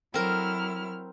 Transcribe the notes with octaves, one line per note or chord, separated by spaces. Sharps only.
F#3 C4 E4 A#4 F6